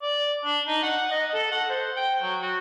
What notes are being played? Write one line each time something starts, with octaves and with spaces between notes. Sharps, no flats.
D5
D4
D#4
F#5
D#5
A4
F#5
C5
G5
F#3
F#4